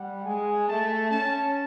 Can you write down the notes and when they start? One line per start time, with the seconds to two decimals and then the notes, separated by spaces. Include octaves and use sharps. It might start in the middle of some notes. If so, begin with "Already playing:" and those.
Already playing: G3 F#5
0.25 G#3 G#5
0.68 A3 A5
1.10 C#4 A5